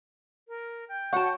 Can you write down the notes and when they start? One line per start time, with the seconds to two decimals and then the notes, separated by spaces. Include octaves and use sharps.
0.48 A#4
0.89 G5
1.13 F#4 C#5 F#5 A5